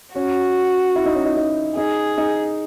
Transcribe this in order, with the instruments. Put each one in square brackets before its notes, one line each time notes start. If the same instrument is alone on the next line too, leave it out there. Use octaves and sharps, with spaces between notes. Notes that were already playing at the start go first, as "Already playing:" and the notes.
[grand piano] C#4 [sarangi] F#4
[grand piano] E4
D#4
C#4
D#4
D#4
[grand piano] D#4 [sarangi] G#4
[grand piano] D#4